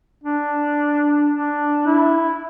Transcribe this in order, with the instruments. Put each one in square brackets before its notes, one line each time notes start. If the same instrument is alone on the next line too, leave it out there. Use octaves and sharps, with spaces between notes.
[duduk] D4
D4
E4